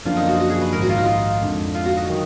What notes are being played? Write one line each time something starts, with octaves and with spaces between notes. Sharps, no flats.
F#2 D3 F3 A#3 D4 F4
D#4
F#4
F#4
G#4
B4
A#1 G#2 D#3 A#4
F#4
F4
D#4
F4
F2 D3 G#3
F4
F#4
D#4
D#3 F#3